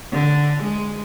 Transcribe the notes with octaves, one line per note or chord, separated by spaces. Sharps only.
D3
G#3